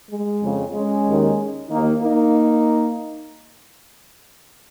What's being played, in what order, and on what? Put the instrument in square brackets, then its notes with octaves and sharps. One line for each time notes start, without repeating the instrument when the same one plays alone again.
[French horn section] G#3
F2 C#3
G#3 C#4
D#2 D#3
D#2 D#3 A#3 D#4
A#3 D#4